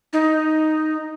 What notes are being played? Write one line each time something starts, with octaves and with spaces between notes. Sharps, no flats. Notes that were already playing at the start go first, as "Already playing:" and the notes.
D#4